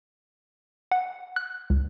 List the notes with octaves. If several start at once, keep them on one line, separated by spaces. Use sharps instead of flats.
F#5
F#6
C#2